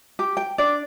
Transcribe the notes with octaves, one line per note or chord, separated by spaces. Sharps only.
G4
G5
D4 D5